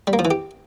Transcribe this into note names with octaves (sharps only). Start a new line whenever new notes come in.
G3
A#3
F3
E3
G4